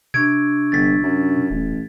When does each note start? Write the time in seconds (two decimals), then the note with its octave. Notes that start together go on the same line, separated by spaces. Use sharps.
0.14 C3 D4 C#6 E6 G#6 D7
0.72 G1 A6 B6
1.03 F#2
1.50 D#1 A1